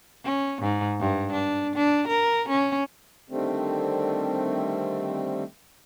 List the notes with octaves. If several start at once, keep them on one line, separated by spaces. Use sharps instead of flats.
C#4
G#2
G2
D4
D4
A#4
C#4
D3 D#3 G3 A3 C4